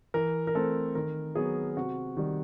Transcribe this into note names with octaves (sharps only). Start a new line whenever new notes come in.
E3 A#4
A#4
A3 C4 A4
D#3 A#4
F#3 B3 G#4
C3 F#4
D#3 G3